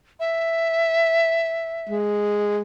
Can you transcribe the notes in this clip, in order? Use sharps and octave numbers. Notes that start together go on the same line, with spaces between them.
E5
G#3